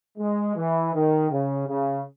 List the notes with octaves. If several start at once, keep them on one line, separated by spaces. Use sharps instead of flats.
G#3
E3
D#3
C#3
C#3